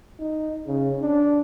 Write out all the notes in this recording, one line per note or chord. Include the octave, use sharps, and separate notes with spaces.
D#4
C#3
D4